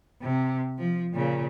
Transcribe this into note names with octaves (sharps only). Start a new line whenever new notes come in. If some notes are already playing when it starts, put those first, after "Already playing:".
C3
F3
A#2 C#3